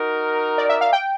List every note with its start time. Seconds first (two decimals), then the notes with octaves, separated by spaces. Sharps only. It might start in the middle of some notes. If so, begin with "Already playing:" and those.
Already playing: D#4 F#4 A#4
0.58 D5
0.69 E5
0.81 F5
0.93 G5